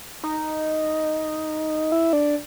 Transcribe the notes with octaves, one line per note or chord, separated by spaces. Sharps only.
D#4
E4
D4